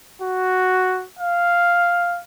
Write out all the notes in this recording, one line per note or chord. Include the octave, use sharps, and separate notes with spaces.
F#4
F5